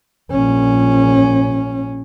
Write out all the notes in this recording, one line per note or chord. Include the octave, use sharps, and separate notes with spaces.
A#1 C#4